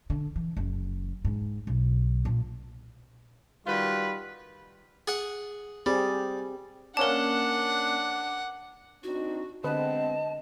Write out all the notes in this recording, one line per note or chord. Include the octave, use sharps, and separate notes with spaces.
D3
E3
F#1
G#2
B1
A#2
D#3 G3 F4 F#4 B4
G#4 F#5
G3 C4 G4 G#4
A#3 C#4 D4 A#4 D5 F#5 A5
C4 D4 D#4 F#4
D3 G#3 B3 C4 B4 D#5 A5